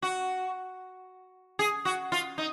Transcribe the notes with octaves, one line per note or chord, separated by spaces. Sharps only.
F#4
G#4
F#4
F4
D#4